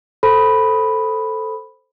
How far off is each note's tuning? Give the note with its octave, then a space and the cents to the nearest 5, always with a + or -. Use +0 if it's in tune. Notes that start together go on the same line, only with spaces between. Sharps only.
A4 +0 C5 +0 B5 +0